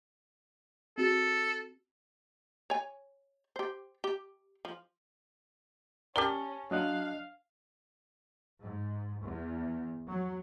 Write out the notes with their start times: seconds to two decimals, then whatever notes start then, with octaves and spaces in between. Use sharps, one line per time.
0.98 C4 F#4 G#4 A4
2.70 C#5 G#5
3.56 G4 C5
4.04 G4
4.65 F3
6.16 C#4 G4 A#4 D5 A5 G7
6.71 F#3 D4 D#5 F5 F#6
8.63 G#2
9.23 E2
10.09 F#3